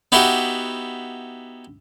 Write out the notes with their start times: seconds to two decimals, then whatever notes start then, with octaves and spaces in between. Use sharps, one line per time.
0.12 B3 D#4 E4 F#4 G4 E5